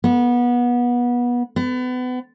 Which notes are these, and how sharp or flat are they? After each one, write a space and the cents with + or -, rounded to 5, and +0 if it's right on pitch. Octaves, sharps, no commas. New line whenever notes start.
B3 -25
B3 +30